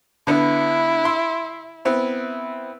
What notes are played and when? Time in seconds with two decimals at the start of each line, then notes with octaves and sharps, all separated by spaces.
0.27 D3 B3 E4
1.04 E5 C6
1.85 B3 C4 E4